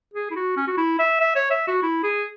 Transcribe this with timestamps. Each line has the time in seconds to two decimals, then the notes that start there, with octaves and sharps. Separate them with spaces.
0.14 G#4
0.31 E4
0.36 F#4
0.57 C#4
0.68 F#4
0.77 E4
0.99 E5
1.20 E5
1.36 C#5
1.51 E5
1.67 F#4
1.83 E4
2.03 G#4